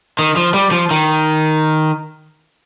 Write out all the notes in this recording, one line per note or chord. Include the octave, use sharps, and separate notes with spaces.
D#3
F3
G3
F3
D#3